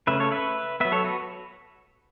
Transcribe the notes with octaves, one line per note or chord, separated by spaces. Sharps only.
C#3 A3 C#4 B4 E5
A4 C#5
B4 E5
F#3 B3 B4 E5
A4 C#5
F#4 B4